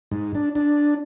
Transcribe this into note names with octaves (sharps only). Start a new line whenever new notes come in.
G#2
D4
D4